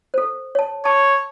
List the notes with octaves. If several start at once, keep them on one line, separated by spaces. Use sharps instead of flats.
A4 C5
C#5 A5
C#5 A5